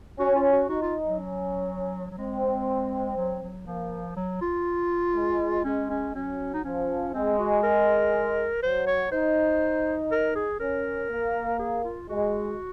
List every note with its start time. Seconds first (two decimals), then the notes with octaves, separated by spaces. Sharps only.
0.19 C#4 F#4
0.36 F4
0.53 F#4
0.69 D#4 F#4
0.82 F4
1.06 F#3
1.19 C#4
2.11 F#3
2.18 G#3 C4
3.17 F#3
3.43 F#3
3.67 F3 A#3
4.16 F#3
4.41 F4
5.15 G#3
5.64 G#3 C#4
5.90 C#4
6.15 F#3 C#4
6.54 D#4
6.64 F3 C#4
7.14 G#3 C4
7.39 F#4
7.63 A#4
8.62 F#3 C5
8.87 C#5
9.12 D#4 C5
10.12 A#4
10.35 G#4
10.60 C#4 A#4
11.10 A#3
11.59 G#4
11.84 F4
12.09 G#3 F#4